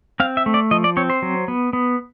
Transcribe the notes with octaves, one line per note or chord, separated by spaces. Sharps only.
C4 F5
E5
A3
D5
F3 D#5
D5
C4 C#5
C5
F#3
B3
B3